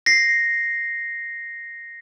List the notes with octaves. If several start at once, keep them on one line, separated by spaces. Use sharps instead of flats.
A#6 C7